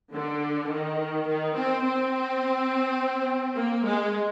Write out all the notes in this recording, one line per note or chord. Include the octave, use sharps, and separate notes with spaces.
D3
D#3
D#3
C4
C4
A#3
G#3